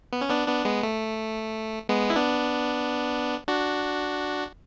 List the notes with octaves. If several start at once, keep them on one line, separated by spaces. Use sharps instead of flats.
B3
C#4
B3 D4
B3 D4
G#3 B3
A3
G#3 B3
E4
B3 D4
D4 F#4